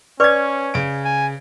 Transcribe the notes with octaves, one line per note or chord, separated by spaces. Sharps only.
C#4 B4 D5 C#6 D6 G#6
C#3 D7
G#5